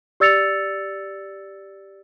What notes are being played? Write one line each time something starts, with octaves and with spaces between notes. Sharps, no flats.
G4 D5 E6 A6 C#7 F7